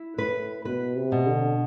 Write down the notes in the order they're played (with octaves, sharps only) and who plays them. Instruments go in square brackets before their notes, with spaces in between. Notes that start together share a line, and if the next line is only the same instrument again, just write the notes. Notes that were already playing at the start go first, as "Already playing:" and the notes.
Already playing: [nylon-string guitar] E4
[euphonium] A2 [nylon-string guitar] B4
[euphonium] B2 [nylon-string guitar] B4
[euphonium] C3
[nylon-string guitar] B2
[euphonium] D3